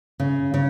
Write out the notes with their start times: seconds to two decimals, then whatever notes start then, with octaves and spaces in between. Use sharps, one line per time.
0.20 C#3
0.54 C#3